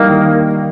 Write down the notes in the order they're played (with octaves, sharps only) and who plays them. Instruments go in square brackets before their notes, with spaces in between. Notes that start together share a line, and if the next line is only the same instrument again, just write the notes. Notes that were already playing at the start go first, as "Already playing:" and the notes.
Already playing: [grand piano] G3 D#4 [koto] A#3
[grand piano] D#3